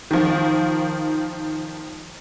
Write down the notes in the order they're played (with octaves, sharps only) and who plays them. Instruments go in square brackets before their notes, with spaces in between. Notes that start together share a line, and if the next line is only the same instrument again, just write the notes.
[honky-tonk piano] D#3 F3